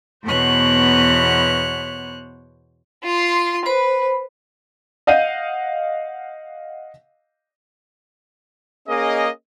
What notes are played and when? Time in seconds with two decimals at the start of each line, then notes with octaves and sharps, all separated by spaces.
0.24 E2 B2 B3 C5 C#5 F#6
3.04 F4 C6
3.66 B4 C5 B5
5.07 D#5 F5 F#5 G6 D#7
8.88 A#3 C#4 G#4 D#5